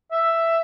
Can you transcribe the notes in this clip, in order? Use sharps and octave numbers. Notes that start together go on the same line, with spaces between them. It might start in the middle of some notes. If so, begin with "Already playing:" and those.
E5